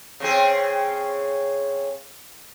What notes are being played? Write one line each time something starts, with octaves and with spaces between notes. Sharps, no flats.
C#3 C4 G#4